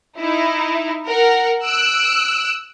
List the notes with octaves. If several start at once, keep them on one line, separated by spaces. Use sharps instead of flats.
D#4 E4
A#4 F#5
E6 F#6 D7